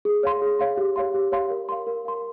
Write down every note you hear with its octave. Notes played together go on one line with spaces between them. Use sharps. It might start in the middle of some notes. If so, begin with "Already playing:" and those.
G#4
C#5 F5 C6
G#4
C#5 F5 C6
G4
C#5 F5 C6
G4
C#5 F5 C6
A#4
F5 C6
A#4
F5 C6